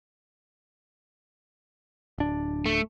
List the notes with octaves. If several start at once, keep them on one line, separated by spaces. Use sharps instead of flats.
D1 D4
A3